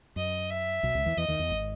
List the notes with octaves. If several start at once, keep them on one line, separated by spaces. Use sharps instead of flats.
F#2 D#5
E5
B1 B2
C#2 C#3
E2 E3
E2 E3 D#5
D#2 D#3
E2
G#1